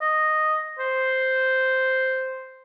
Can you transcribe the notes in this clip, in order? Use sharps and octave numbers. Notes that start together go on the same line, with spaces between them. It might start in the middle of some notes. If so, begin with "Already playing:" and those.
D#5
C5